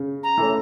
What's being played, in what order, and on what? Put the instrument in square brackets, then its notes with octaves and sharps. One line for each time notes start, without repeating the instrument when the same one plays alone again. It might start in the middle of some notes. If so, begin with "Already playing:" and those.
Already playing: [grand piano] C#3
[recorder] A#5
[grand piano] E3 A3 C#4